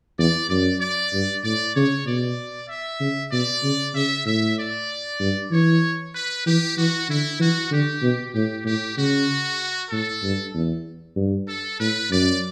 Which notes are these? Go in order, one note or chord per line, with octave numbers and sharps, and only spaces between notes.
E2 D5
F#2 D5
D5
G2
A2 D5
C#3 C#5
B2 D5
E5
C#3
B2 D5
C#3
C#3 E5
A2 E5
D5
G2
E3 C#5
B4
E3 G4
E3 F#4
D3 E4
E3 F#4
D3 G4
B2
A2 G4
A2 G4
C#3 F#4
A2 A4
G2
E2
G2
A4
A2 B4
F#2 D5